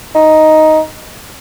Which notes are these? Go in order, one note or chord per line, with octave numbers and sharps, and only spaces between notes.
D#4